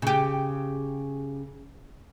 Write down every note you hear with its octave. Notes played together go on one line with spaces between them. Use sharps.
C#3 G4